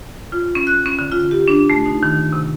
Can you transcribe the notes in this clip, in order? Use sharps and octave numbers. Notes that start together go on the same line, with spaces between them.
F4
C#4
F#6
C#4
D3
F4
G4
D4
A3
D#4
D#3
C3